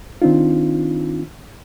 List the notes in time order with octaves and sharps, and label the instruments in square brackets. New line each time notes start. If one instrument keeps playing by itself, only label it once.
[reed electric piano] D#3 C4 D4 D#4 F4